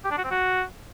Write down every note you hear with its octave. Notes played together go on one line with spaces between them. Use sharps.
G4
D4
F#4
C4
F#4